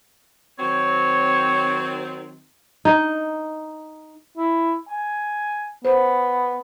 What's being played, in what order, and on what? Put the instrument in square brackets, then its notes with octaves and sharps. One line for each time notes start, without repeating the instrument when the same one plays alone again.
[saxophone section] D#3 F#3 C4 [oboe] C#5
[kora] D#4
[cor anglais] E4
G#5
[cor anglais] B3 [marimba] C5